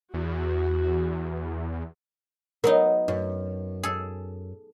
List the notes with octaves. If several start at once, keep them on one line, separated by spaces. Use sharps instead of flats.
E2 F#4
F#3 B3 D#4 A#4
F#2
G#4 A4